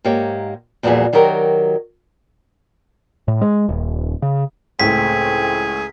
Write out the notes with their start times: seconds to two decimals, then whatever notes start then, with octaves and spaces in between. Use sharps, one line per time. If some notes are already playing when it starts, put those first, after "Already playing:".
0.05 G#2 A#3 G4 C#5
0.83 E2 A#2 F3 G3 F#4 G#4
1.13 D#3 F#3 F#4 G4 A#4
3.28 A2
3.41 G#3
3.69 D#1
4.22 C#3
4.80 C#2 A2 A3 C4 G#4 B6